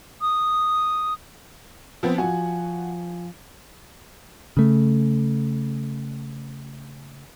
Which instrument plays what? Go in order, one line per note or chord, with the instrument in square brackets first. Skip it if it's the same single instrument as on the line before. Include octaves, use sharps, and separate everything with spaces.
[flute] D#6
[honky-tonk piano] F3 B3 C4
[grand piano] F3 G#5 [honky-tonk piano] F#4
[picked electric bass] C#3 A3